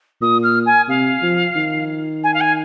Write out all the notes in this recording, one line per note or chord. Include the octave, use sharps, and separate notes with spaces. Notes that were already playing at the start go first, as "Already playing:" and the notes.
A#2 D#6
F6
G#5
C3 F5
F3
D#3
G#5
F5
G#5